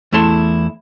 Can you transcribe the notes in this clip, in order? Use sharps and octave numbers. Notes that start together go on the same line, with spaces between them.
E2 A3 E4 A5 C6